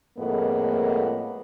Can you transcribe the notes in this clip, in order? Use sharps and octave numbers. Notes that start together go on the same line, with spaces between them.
F2 A2 G#3 A#3 B3